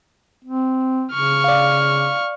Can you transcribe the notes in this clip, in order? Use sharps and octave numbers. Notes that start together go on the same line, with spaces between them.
C4
C#3 C#6 F6
D5 F5